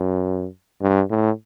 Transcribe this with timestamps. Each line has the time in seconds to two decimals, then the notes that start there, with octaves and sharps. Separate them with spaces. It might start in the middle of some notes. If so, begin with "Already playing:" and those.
Already playing: F#2
0.82 G2
1.10 A2